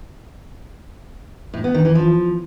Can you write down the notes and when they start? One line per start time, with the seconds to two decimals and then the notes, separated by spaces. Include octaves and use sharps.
1.54 A2
1.64 B3
1.74 D#3
1.85 E3
1.95 F3